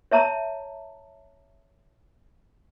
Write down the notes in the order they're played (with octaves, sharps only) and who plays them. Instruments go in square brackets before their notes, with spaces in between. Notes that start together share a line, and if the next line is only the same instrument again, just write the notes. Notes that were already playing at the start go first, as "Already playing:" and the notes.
[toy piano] C#5 E5 A5 A#5